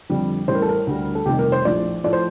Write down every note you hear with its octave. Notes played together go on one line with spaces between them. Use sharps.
F2 D3 G3
A1 A2 G3 C5
A#4
A4
A#4
D2 D3 G3
A4
F1 F2 D#3 G3 G4
A#4
C5
A#1 A2 F3 D5
A2 F3 D5
C5